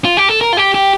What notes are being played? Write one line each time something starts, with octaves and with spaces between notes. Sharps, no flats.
F4
G4
A4
A#4
F4
G4
G4